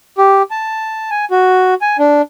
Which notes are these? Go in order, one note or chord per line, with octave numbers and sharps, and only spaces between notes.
G4
A5
G#5
F#4
G#5
D4